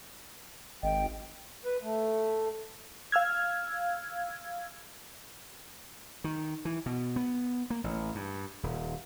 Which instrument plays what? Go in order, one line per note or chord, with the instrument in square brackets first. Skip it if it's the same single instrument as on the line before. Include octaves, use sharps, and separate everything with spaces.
[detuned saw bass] G#1 [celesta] D#5 F5 [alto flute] G5
[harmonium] B4
A3
[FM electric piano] F5 E6 F6 G#6
[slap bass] D#3
E3
B2
B3
A#3
A1
G2
D#1